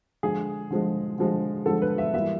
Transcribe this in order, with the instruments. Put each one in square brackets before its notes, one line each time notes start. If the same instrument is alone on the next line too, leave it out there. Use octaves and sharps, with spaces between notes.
[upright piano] D3 F3 G#3 G#4
D3 F3 G#3
D3 F3 G#3
D3 F3 G#3 A4
B4
E5
E3 G3 A#3 E5